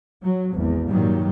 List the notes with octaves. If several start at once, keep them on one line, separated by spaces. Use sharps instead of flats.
F#3
G#1 E2
G2 A#2 D#3 F#3 G3